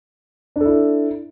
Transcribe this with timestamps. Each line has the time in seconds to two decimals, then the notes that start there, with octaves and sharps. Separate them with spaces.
0.56 D4
0.60 A4
0.65 E4